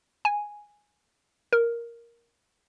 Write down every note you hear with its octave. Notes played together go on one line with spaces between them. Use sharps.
G#5
A#4